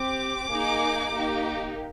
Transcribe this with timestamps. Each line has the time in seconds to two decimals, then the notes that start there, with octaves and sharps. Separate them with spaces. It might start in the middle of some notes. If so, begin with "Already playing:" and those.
Already playing: C4 G4 D6
0.50 A#3 D#4 G#4
1.13 A#3 D#4 G4